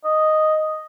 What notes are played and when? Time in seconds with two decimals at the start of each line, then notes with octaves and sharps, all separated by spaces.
0.05 D#5